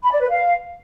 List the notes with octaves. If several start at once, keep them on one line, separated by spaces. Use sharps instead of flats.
B5
D5
B4
F5